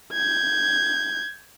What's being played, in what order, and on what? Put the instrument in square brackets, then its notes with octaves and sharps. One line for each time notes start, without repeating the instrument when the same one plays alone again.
[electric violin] G6 G#6